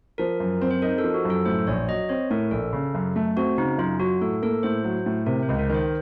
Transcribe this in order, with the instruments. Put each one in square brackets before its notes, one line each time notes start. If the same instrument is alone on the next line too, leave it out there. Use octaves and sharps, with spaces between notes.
[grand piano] F3 [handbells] A#4
[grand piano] F#2
C4
[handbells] C5
[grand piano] D#4 [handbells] A#4
[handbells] A4
[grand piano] F3
[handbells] F#4
[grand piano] F#2
[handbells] A4
[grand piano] A2 [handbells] C5
[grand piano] A#1 [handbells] C#5
[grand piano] F#3 [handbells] D#5
[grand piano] C4 [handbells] C#5
[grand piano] A2 [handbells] A#4
[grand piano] A#1 [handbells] A4
[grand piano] C#3
F#2
A3
[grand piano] C4 [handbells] F#4
[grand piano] C#3 [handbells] D#4
[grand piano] F#2 [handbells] F4
[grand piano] F#3 [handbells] F#4
[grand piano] A2 [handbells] A4
[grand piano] A#3 [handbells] A4
[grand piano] A2 [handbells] C5
[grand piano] F#3
A2
[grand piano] C3 [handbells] A#4
[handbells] C5
[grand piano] C#2
[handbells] A#4
[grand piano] D#3 [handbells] C5